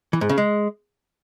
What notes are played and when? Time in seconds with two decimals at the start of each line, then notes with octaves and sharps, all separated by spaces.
0.13 E3
0.21 G#2
0.29 C#3
0.38 G#3